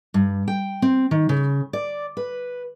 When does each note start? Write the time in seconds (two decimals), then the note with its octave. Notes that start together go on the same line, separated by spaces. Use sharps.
0.14 G2
0.48 G5
0.82 C4
1.11 D#3
1.29 C#3
1.73 D5
2.17 B4